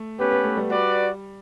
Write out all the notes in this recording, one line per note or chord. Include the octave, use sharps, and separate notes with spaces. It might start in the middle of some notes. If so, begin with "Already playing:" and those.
Already playing: A3
B3 C#4 G4 B4
B3
A3
G3
F#4 B4 D5